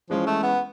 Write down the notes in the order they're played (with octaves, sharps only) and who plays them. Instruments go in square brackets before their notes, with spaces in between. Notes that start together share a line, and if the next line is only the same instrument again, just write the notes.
[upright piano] E3 G#3 C#4 [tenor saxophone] F3
[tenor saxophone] A3
B3